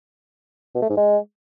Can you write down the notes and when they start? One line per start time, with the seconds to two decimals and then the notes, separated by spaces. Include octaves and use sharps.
0.75 B2
0.82 A3
0.90 G#2
0.97 G#3